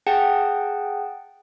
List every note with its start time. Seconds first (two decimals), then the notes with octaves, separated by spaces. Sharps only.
0.07 G#4 F#5 G5 A5